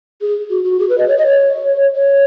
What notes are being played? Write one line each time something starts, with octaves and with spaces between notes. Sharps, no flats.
G#4
F#4
F#4
G#4
B4
D#5
C#5
D#5
C#5
C#5